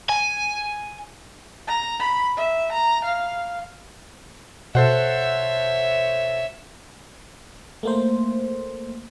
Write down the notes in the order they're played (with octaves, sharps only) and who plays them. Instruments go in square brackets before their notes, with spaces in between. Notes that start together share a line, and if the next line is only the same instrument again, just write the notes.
[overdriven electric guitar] G#5
[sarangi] A#5
B5
E5
A#5
F5
[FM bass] B2 [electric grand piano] A4 C5 F#5 [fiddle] C#5 E5
[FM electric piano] A3 A#3 C5